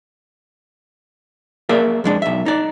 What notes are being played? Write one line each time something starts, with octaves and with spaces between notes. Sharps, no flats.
A#3 G#4 A#4 D5 E5
F2 G#3 D4
B1 E5
D#4 D5